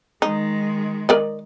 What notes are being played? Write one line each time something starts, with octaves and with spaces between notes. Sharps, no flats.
D#3 G#3 D#4
A#4 D5 D#5